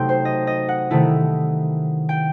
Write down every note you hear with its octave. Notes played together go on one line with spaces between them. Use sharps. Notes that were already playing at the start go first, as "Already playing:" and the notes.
Already playing: C3 F#3 A3 D#4 G5 C6
C5
D#5
D#5
F#5
C3 D#3 A3 E4
G5